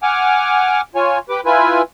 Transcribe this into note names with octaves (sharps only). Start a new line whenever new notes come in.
F#5 G#5 D6 F6
F4 C#5 G#5
G4 B4 D6
E4 F4 B4 G#5